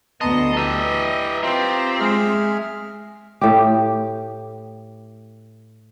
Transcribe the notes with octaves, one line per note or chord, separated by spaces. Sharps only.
D2 B3 D#5 A5 A#5 C6
E3 G4 D#5 E5 A#5
C4 F4 G4 A#5
G#3 G#4 E5 F6
A2 G4